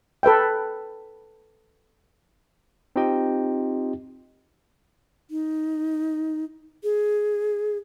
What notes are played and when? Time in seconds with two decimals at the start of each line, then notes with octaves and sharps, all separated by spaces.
0.23 A4 B4 E5 G5
2.96 C4 D#4 F4 G4 D#5 G5
5.31 D#4
6.83 G#4